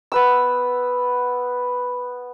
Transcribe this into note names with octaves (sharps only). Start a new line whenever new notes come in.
B3 B4 E6